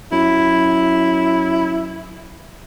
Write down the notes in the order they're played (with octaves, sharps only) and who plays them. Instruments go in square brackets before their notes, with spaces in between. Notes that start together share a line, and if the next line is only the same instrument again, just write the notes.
[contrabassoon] F#2 [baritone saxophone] E4